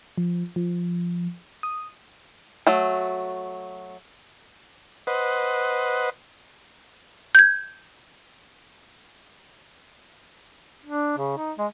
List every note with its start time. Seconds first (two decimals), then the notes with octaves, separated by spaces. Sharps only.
0.18 F3
0.56 F3
1.63 D#6
2.67 F#3 A3
5.07 B4 C5 D#5 F#5
7.35 G6 G#6
10.85 D4
11.18 C#3
11.37 D#4
11.58 G#3